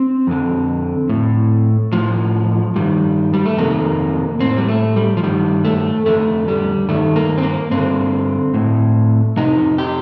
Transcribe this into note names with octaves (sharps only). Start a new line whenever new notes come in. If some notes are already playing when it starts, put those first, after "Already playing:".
Already playing: C4
F2 D3
A2
A2 F3
G2 D#3 G3
G3
A3
F2 C3 D#3 A#3
A2 C4
G3
A3
G3
F3
G2 D#3 G3
A3
F2 D3 A3
G3
G2 D#3 A3
A#3
C4
A#3
G2 D3 C4
A2
F2 C3 D#4
G4